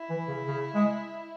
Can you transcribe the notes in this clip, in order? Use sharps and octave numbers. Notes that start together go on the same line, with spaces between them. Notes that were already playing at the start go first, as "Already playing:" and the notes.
Already playing: E4
E3
C#3
C#3
G#3